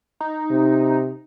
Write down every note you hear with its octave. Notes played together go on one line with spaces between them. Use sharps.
D#4
C3